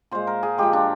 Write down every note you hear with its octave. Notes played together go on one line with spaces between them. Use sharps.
A#2 G#3 C5
A#4
G#4
A#2 F3 G#3 G4
D4